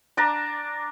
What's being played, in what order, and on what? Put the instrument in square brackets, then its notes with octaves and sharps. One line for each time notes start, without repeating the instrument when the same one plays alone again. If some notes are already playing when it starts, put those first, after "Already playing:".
[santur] D4 D5 A5 A#5